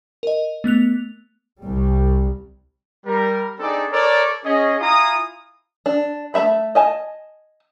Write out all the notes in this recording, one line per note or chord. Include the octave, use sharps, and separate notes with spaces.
A#4 D#5
A3 B3 F#6 F7
C2 G3
G3 A#4
C4 D4 D#4 G#4 A4 D5
A4 A#4 C#5 D5
C#4 G#4 D#5
E4 F4 G#5 A#5 D#6
D4
A3 E4 E5 B5
D#5 G#5 A5